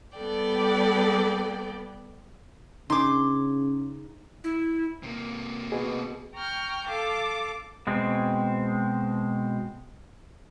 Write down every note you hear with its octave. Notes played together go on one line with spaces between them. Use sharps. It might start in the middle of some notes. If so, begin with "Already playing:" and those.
G3 B3 A4 D5 G5
C#3 D#4 G#4 C6 D6
E4
C3 A#3
B2 G#4
G5 A#5 C#6 F6 G6
A4 F5 A5 D6
B2 G#3 C4